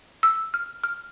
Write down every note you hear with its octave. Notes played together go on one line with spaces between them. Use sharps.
E6
F6
F6